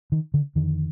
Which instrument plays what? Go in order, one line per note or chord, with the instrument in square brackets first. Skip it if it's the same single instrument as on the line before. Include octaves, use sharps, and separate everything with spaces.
[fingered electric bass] D#3
D3
F2 D3 D#3